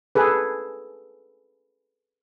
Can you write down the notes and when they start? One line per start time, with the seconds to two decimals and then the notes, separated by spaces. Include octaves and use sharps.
0.15 G#4 A4 B4